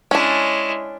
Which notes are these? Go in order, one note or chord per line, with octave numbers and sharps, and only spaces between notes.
G#3 C#4 D4 E4